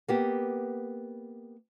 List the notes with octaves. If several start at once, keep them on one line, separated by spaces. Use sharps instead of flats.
A#3 B3 G4